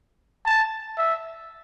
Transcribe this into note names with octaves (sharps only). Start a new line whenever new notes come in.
A5
E5